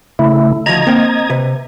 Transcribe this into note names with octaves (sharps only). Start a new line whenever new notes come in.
C#3 A3 E4
D2 F3 D#5 A#5 G#6
A#3 C4 G5
C3 B4